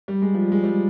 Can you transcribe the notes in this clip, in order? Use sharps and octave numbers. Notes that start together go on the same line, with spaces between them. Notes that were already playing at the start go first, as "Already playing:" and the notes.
G3
G#3
F3
G#3
G3